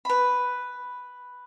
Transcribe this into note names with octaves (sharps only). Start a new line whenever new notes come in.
B4 B5